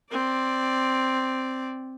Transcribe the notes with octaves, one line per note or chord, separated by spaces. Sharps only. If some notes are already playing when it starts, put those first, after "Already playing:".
C4 D5